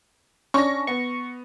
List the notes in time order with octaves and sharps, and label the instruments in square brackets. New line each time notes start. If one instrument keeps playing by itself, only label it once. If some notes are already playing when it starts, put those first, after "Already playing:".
[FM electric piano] C#4 D4 [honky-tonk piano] C#6 A#6
[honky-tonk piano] B3 [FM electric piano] C#6